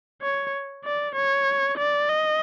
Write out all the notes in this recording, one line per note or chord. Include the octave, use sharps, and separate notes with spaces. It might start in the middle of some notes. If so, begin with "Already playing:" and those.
C#5
D5
C#5
D5
D#5